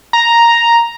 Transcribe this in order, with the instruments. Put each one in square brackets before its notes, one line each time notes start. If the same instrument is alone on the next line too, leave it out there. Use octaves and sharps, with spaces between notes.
[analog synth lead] A#5